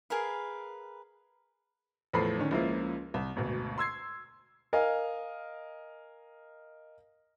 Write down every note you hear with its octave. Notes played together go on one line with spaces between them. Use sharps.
G#4 A#4 B4 F5
E2 A2 F3 A4 B5 C7
D3 D#3 C#4
C#2 C#3 F3 A#3 E4
C2
G#1 D2 B2
C6 E6 G#6 C7
A#4 D#5 F5 G#5